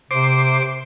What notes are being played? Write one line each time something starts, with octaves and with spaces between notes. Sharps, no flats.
C3 C5 D6